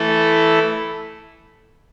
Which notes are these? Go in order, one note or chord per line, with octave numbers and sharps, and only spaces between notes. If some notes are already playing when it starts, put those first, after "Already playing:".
Already playing: E3 A3 E4 A4